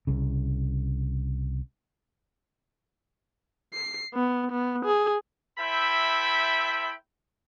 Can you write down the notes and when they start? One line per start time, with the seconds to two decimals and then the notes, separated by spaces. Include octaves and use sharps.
0.07 C2 C#3
3.73 C7
4.14 B3
4.51 B3
4.85 G#4
5.59 E4 A4 C5 E5 G5 B5